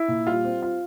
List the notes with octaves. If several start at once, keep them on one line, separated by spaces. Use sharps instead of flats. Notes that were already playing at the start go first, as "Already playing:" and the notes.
Already playing: E4
A#2
G3 F4
C4
F4